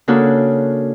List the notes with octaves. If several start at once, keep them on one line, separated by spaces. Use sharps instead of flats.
C#3 A#3 D4 F#4 A4